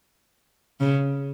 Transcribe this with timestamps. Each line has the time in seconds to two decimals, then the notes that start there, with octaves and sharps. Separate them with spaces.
0.80 C#3